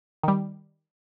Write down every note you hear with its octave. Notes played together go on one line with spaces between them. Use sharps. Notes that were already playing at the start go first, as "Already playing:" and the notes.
D#3 G3